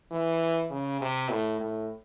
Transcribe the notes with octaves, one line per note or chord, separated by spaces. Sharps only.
E3
C#3
C3
A2
A2